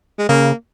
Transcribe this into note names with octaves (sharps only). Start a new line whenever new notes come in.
G#3
C#3 A#3